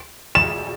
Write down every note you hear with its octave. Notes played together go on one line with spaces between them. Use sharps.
E7